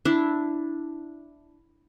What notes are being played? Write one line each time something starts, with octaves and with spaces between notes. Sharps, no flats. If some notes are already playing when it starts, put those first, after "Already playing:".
D4 E4